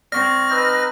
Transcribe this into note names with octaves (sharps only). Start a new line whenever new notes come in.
C4 D5 C#6 F6 A#6
D#4 B4 E6 G6